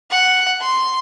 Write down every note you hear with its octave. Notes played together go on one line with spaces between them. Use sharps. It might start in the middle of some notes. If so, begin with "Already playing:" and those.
F#5
C6